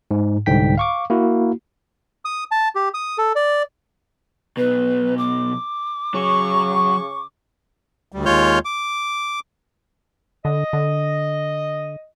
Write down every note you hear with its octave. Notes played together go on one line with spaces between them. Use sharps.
G#2
C2 G#2 D3 G5 B6
F5 C#6 D6
A#3 E4 F#4
D#6
A5
G4
D#6
A4
D5
B1 B2 B4
D6
C#3 F#3 C#6
D2 G3
D#2 G#3 F4 C#5 F6 G6
D6
D3 D#5
D3